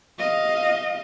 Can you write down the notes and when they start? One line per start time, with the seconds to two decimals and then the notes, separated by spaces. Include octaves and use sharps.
0.19 D#5 F5